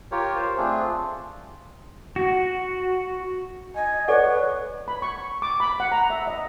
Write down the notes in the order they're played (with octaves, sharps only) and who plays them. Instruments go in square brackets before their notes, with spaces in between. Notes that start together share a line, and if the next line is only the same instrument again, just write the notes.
[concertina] F4 G4 A#4 C#5
C5
A3 C4 D4 F4 G#4
[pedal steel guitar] F#4
[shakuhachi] D#5 [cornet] G#5
[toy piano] A4 D5 F#5 [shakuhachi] B4 [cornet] C#5
[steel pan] B5
C#6
D6
B5
F#5
A#5
E5
D#5